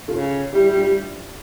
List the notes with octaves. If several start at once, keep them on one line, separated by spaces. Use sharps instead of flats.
C#3 F4 A4
G3 E4 G4
G3
D4 F4
G3